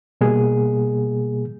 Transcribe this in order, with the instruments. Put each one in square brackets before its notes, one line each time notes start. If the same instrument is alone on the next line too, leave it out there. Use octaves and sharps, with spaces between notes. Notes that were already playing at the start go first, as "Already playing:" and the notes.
[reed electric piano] B2 G3 A#3 G#4